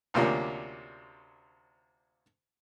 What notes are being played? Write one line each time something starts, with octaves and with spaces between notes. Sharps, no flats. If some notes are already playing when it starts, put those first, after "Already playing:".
D2 C3 F3 A#3 C#4 D4